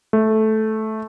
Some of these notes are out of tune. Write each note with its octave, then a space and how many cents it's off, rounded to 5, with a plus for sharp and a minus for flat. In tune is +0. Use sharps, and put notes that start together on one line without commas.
A3 -10